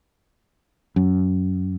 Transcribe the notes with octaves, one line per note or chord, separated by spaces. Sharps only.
F#2